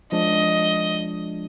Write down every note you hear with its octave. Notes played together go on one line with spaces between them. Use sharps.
F3 G#3 D4 D#5